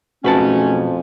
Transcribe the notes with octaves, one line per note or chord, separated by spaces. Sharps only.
B1 F2 G#2 A3 C#4 F#4 B4 A5